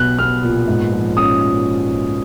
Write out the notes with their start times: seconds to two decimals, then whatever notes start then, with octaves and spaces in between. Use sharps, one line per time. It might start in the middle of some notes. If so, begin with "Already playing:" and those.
Already playing: B1 B3 F#6
0.19 B3 F6
0.43 A#2
0.68 G#2
0.92 F3
1.17 C#4 D#6